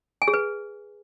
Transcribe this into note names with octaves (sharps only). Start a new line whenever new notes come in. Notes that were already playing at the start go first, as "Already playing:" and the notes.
G#5
G#4
B4